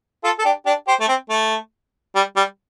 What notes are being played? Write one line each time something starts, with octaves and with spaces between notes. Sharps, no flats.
F4 A4
A4
D4 G4
D4 G4
G4 C5
A3
C4
A3
G3
G3